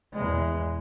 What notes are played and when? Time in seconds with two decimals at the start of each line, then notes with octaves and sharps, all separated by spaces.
0.13 E2 G#3